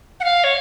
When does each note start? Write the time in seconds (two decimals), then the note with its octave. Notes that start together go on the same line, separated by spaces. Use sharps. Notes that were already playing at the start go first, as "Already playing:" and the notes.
0.20 F#5
0.24 F5
0.44 C#5